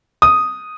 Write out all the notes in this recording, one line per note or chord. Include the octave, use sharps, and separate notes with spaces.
D#6